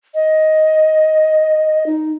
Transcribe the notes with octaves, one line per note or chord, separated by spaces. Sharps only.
D#5
D#4